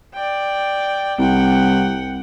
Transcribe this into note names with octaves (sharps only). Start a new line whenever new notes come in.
D5 G5
C2 F#5 G5